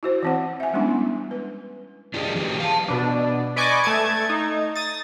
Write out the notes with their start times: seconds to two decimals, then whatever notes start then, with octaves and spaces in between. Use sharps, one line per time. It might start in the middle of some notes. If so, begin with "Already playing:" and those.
0.03 E4 F#4 C5
0.23 E3 C4 F#5
0.60 E5 G#5
0.73 G3 G#3 B3 C#4 D4 E4
1.31 B4
2.14 D4 F4 G4 G#4 A#4 D#5
2.35 E3 F#3 G4
2.60 F5 A5
2.88 B2 D4
3.56 B4 D5 D#5 G#5 C#6 D6
3.84 A3 A5 G#6
4.29 D#4
4.75 D#6 A6